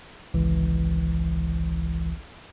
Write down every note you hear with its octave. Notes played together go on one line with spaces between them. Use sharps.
G#1 C#2 E3